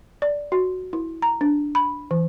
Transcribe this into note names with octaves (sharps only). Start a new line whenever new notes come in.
D5
F#4
E4
A#5
D4
B5
E3